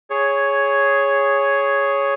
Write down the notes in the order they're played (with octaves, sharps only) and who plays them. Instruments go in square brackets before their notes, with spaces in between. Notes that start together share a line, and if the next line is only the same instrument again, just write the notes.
[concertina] G#4 C#5